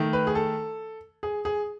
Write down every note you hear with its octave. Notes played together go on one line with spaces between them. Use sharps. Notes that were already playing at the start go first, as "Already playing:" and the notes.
Already playing: D#3 A3
B4
G#4
A4
G#4
G#4